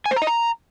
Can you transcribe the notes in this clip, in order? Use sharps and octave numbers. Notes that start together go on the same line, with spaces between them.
G#5
C5
A#5
D#5
A#5